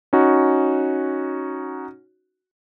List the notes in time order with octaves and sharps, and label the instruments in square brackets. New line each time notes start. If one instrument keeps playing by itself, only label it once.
[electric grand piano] C#4 D#4 F#4